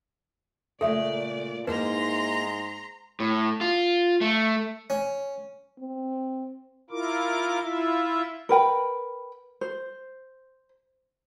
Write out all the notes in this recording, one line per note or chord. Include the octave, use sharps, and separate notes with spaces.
A#2 C#3 G#3 A3 A4 D5 E5
G#2 A#3 D#4 E4 B4 A#5 C6
A2
F4
A3
C#4
C4
E4 F4 A#4 D6
E4 F4 E5
A#4 B4 G5 B5
C5